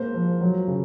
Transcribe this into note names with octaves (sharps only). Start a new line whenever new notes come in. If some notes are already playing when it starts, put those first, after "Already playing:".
Already playing: B2 G#3 A#3 C5
F3
F#3
C#3